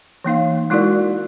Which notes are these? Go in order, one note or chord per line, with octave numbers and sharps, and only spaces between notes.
E3 A#3 D#4 F5
G#3 D#4 E4 F#4 A#4 D5